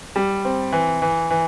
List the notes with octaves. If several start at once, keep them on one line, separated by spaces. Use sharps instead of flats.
G3
C4
E3
E3
E3